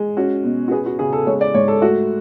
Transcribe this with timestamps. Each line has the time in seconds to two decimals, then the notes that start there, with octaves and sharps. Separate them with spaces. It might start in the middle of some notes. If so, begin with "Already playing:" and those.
Already playing: G#3
0.17 C#4 F#4
0.44 B2
0.68 F#4
0.71 B3 G#4
0.86 F#4
0.99 C#3 G#4
1.13 A4
1.27 G#3 C#5
1.41 D5
1.54 G#2 C#5
1.68 A4
1.81 A3 F#4